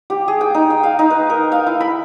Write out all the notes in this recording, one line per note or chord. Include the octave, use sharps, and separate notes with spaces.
G4
G#4
G5
D#4
G5
F5
D#4
B4
A#4
F5
E4
B5